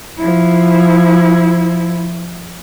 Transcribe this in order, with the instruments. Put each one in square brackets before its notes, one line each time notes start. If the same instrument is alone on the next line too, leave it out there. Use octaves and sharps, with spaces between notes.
[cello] F3 E4